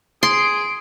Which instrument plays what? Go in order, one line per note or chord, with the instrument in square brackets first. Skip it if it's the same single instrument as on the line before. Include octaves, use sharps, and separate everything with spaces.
[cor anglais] G#4 [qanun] C6 [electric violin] D7